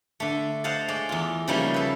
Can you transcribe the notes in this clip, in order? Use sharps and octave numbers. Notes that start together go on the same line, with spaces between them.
D3 A3
C5 D#5 F5 F#5 A5
G#3 C#5 D5
E2 F4
C#3 F3 G3 A3 A#3 D#4
A4 B4